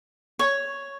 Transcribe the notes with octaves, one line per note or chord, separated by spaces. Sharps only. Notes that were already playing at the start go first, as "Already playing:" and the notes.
C#5